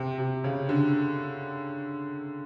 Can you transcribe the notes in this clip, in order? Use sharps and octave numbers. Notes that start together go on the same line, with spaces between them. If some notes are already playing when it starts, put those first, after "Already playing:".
Already playing: C3
C3
C#3
D3